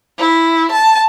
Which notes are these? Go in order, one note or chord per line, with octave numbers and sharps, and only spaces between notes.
E4
A5